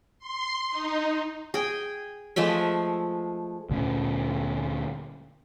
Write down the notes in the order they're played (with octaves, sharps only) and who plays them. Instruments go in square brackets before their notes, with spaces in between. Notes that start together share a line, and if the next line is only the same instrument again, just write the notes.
[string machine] C6
D#4
[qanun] G#4 G5
F3 G#3 A3 E5
[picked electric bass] D2 A#2 C#4